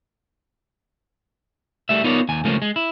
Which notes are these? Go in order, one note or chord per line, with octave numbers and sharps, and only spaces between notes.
G3 A3 E5
B3 D#4 F4 A#4 C#5 D5
D#2 G#5
C#2 F3 A3 A#3 C#4
G#3
E4